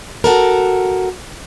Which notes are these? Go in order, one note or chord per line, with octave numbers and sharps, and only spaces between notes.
F#4 A4 A#4